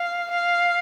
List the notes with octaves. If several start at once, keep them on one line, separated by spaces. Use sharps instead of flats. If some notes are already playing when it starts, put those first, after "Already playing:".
Already playing: F5
F5